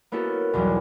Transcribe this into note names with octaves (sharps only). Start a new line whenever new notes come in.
A#3 B3 C#4 E4 F#4 A4
B1 E2 E3 F#3 G3